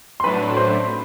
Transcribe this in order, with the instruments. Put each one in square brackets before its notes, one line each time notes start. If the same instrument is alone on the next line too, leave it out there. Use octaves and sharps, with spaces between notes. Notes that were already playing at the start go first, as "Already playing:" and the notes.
[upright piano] C6
[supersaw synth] A2 F#3 A3 D4 [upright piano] B4 B5
[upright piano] C5 C6